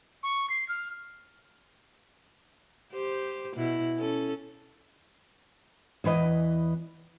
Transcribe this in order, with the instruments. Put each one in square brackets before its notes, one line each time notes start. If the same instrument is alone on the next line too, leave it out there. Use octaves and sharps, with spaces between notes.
[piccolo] C#6
C7
F6
[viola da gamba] G4 C5
B2 E4
C#4 A4
[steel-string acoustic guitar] E2 E3 B4 D#5